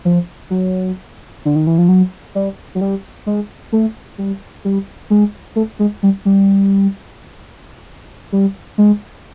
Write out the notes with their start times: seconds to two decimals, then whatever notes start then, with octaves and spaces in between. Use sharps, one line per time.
0.05 F3
0.50 F#3
1.45 D3
1.56 D#3
1.67 E3
1.78 F3
1.89 F#3
2.35 G3
2.75 F#3
2.81 G3
3.26 G#3
3.72 A3
4.18 G3
4.65 G3
5.10 G#3
5.56 A3
5.79 G#3
6.03 G3
6.25 G3
8.32 G3
8.78 G#3